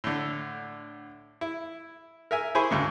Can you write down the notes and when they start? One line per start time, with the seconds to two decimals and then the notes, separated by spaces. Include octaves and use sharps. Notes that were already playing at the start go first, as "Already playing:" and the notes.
0.04 A2 D3
1.41 E4
2.31 A#4 E5 G#5
2.55 E4 G#4 C5 G#5 B5 C#6
2.71 D2 G#2 C#3